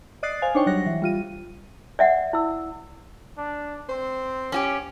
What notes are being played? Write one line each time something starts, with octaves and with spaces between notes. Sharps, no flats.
D5 D#5 D#6 F#6 A6 C7
C5 F5 G#5
D4 D#4 C5 C#5 G5 C#6
F#3 G3 C#5 F#6 A#6
E3
G3 F4 D#7
D5 E5 F#5
E4 E6
D4
C4 C5
C#4 F#4 G4